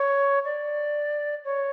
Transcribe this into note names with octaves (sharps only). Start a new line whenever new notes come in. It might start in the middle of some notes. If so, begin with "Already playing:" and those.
Already playing: C#5
D5
C#5